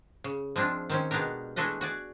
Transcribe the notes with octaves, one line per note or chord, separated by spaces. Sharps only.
C#3
F3 G#3 C4 D4 F4
D#3 C4 C#4
B2 G#3 B3 D4 G4 A#4
E3 G#3 A3 D4 D#5 F#5
F#4 G#4 D5